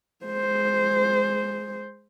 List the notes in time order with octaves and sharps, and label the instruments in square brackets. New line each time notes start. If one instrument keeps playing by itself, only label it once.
[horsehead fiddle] G#3 C5